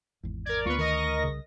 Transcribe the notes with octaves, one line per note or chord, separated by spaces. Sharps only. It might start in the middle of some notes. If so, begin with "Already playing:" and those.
G#1 E2
A#4 D5 G#6
D2 A3 B3 F4 B4 C#6
D#3 A#4 D#5 A#6
C2 C#3